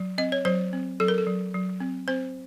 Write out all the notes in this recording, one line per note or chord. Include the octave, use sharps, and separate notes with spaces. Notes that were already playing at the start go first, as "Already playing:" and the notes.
Already playing: F#3
C4 D#5
C#5
F#3 C5
C4
F#3 A4
A#4
A4
F#3
F#3
C4
C4 C5